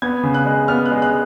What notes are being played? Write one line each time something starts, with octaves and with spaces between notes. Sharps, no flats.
B3 G#6
C#3
F#6
G#3
B3 F6
F#6
G#3
F#6